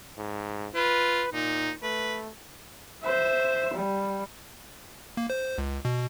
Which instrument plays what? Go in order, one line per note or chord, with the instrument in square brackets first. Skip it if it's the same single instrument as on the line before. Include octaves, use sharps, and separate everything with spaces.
[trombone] G#2
[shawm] F4 [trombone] B4
[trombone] A#2 [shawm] D#4
[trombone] A3 [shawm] B4
[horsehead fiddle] C5 E5
G3
[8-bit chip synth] A#3
C5
C#2
B2